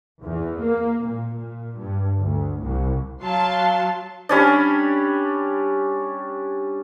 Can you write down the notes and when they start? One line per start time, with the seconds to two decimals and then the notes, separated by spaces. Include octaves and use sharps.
0.22 E2
0.61 A#3
1.06 A#2
1.36 A#2
1.78 G2
2.19 D2
2.61 C2
3.22 F#3 F5 A5 C6
4.29 G3 C#4 D4